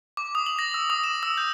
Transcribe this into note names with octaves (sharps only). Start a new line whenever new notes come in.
D6
D#6
F#7
A#6
E6
D#6
E7
E6
G6